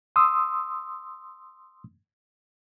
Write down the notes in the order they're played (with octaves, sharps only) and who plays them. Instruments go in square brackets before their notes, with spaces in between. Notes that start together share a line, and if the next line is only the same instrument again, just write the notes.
[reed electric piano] C6 D#6 E6